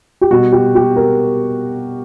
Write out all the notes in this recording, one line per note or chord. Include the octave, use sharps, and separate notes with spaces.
G4
B2 G3 F#4
G4
G4
A#4